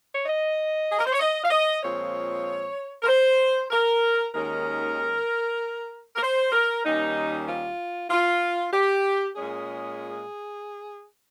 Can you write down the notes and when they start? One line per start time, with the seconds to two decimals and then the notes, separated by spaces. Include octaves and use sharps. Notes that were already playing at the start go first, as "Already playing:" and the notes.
0.14 C#5
0.25 D#5
0.90 G#4
0.98 A#4
1.06 C5
1.12 C#5
1.20 D#5
1.44 F5
1.50 D#5
1.83 A#2 F3 G#3 C4 C#5
3.02 A#4
3.07 C5
3.70 A#4
4.34 D#2 D#3 G#3 C#4 A#4
6.15 A#4
6.22 C5
6.52 A#4
6.84 D#2 D#3 G3 C#4 D#4
7.47 F4
8.09 F4
8.72 G4
9.35 A#2 G#3 C#4 G#4